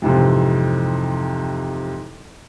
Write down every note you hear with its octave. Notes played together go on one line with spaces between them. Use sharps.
F2 G#2 C3 E3